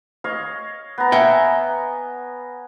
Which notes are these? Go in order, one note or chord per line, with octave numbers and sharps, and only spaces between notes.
C#5 D#5 F5
B3 A#5
E5 G5 G#5